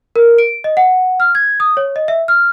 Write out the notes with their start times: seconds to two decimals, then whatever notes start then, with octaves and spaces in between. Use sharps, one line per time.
0.16 A#4
0.38 D7
0.64 D#5
0.77 F#5
1.20 F6
1.35 G#6
1.60 D#6
1.77 C#5
1.96 D#5
2.08 E5
2.28 F6